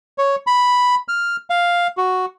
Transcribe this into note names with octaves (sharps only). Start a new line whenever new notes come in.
C#5
B5
F6
F5
F#4